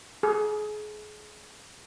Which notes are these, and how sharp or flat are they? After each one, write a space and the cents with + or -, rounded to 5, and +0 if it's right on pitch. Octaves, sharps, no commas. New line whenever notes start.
G#4 +30